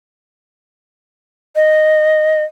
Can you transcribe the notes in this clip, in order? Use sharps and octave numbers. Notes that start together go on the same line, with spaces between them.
D#5